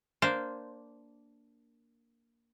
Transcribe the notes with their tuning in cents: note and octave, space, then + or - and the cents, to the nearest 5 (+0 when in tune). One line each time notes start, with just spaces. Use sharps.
A#3 +0 D4 -10 C5 -5